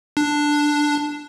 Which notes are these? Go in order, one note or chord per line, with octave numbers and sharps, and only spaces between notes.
D4